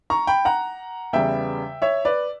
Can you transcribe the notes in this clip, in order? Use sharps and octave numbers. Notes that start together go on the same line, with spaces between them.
A#5 C#6
G5 B5
F#5 A#5
E2 C#3 G3 B3 E5 G5
C#5 E5
B4 D5